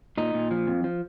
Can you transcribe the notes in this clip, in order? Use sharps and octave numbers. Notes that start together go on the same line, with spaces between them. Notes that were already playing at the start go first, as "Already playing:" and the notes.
A#2 D#4
A#2
F3
F2
F3